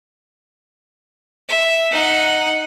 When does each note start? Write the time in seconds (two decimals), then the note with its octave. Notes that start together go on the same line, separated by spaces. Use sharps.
1.49 E5
1.91 D#4 F#5